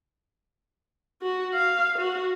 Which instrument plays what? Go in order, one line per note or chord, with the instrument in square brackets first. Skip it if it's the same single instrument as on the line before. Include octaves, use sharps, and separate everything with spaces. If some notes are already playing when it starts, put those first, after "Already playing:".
[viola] F#4
F5
F#4